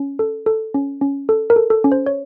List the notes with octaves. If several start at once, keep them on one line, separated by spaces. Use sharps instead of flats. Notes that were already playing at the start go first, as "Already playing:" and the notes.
Already playing: C#4
A4
A4
C#4
C#4
A4
A#4
A4
A4
C#4
C5
C#5